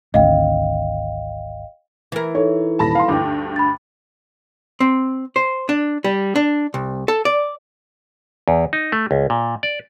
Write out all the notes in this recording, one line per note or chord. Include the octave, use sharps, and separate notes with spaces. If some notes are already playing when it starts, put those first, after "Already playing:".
G#1 D2 D#5 F5 G5
E3 A#4
D#4 A4 C#5
D#1 A5 B5 A#6
F5 C6
D2 G2 G5 D6
B5 A6
C4
C5
D4
G3
D4
C2
A4
D5
E2
D#4
A3
C#2
A#2
D5